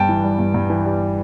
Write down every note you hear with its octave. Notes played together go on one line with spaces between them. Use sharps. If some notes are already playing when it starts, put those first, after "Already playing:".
Already playing: G2 G5 A5
E3
G3
G2
G2
E3
G3